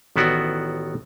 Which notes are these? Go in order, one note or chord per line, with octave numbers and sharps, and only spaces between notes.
A1 D#3 B3 E4 F#4 D5